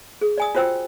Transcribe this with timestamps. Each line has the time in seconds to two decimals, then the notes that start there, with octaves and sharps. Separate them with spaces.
0.21 G#4
0.38 D5 G#5 D#6
0.55 F4 F#4 C5 G5 E6